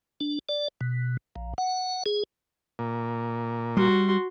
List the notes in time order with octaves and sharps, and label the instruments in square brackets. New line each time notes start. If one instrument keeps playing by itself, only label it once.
[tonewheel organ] D4
D5
B2
A#1
F#5
G#4
[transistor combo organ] A#2
[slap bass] G3 [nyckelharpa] F#4 C6